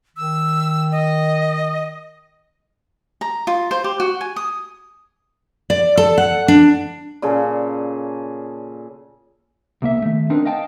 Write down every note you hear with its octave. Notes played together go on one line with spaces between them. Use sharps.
D#3 E6
D#5
A#5
F4
C5
G4
F#4
G#5
D#6
D5
A4
F#5
D4
A#2 C#3 G#4 A4
C2 A#3 E5
D#3 A3
C4 D4 D#4 A#4 B4
D#5 F5 G5 A5